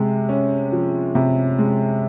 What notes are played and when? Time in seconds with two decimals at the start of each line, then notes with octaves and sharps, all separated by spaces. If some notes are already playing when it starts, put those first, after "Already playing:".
Already playing: C3 G#3
0.29 C#4
0.72 F3
1.15 C3
1.58 G#3